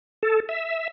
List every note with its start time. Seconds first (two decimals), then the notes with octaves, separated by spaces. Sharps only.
0.23 A4
0.49 E5